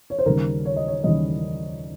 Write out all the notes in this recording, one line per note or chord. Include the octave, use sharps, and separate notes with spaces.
C#5
C5
D#2 C#3 G3 A#4
C#5
D#5
C#5
D#2 C#3 G3 D#5